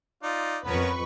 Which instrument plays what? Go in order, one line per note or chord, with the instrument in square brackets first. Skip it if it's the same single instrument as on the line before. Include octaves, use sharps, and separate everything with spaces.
[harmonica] D#4 F4 D5
[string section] F2 B4 C#6 [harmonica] B3 C#4 A#4